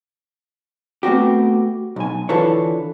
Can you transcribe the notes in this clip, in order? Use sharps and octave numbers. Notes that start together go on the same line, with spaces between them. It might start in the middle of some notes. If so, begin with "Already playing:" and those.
A3 B3 C4 F#4 G4
B1 G#5
D3 E3 F4 A4 B4 C#5